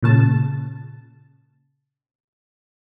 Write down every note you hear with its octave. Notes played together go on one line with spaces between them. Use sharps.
A#2 C#3 A5